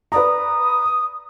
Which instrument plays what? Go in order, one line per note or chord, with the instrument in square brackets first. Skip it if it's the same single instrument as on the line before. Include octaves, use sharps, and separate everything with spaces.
[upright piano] B4 D5 A#5 [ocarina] D#6